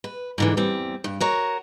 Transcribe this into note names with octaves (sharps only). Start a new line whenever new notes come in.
B4
G#2 D3 E3
E2 G3 C4
G2
F#4 A#4 C#5